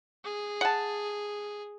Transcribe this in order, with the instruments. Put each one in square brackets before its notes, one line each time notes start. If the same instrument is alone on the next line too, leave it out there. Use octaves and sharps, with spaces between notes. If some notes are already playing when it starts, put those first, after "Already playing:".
[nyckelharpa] G#4
[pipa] F#5 A5